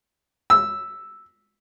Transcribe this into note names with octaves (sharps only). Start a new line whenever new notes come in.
E6